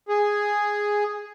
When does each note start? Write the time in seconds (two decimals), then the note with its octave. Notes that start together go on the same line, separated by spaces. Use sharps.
0.09 G#4